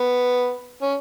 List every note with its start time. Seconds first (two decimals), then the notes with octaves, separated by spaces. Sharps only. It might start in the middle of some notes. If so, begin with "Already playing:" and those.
Already playing: B3
0.82 C#4